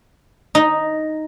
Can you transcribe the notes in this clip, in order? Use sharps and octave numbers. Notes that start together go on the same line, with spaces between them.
D#4